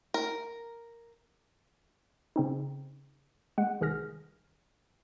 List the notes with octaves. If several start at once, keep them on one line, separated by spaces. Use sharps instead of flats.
A#4
C#3 C4 D#4
G#3 F#5
C2 D#3 G#4 F6 A#6